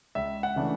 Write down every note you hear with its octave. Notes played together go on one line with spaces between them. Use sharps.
C#2 E5
F#5
C#3 E3 A3 D4